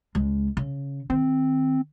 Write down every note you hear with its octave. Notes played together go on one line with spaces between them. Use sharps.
C#2 G#3
C#3
D#3 C4